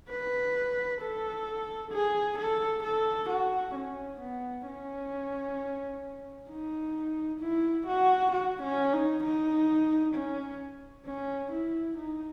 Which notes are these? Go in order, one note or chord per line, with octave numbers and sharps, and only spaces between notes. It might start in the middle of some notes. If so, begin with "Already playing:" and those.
B4
A4
G#4
A4
A4
F#4
C#4
B3
C#4
D#4
E4
F#4
F#4
C#4
D#4
D#4
C#4
C#4
E4
D#4